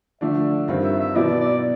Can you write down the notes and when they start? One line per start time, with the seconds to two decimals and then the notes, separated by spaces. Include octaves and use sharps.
0.21 D3 F3 A3 D4 E5
0.68 G2 D#3 G3 C4 F4
0.84 E5
1.00 E5
1.15 B2 F#3 B3 E4 D5
1.40 D5